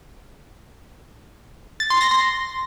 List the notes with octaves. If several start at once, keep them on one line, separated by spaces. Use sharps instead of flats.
A6
C6
A#6
C6